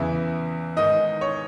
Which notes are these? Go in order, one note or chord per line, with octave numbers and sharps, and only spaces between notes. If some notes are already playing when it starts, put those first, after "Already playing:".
Already playing: E2 C#3 E3 E5
G#2 D#3 D#5
C#5